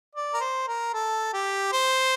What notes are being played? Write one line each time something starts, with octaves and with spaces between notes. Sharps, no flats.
D5
A#4
C5
A#4
A4
G4
C5